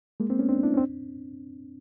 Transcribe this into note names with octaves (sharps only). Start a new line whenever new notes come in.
G#3 A#3
A#3 C4
B3 C#4
C4 D4
D4 E4
C#4
C4 D4